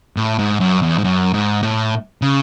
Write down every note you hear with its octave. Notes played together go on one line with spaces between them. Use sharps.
A2
G#2
F#2
E2
G#2
F#2
G#2
A2
C#3